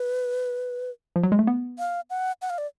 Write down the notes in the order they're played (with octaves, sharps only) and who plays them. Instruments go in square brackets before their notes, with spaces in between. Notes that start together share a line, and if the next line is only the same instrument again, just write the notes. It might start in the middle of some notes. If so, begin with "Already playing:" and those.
Already playing: [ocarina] B4
[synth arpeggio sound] F3
F#3
G#3
A3
B3
[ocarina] F5
F#5
F#5
F5
D5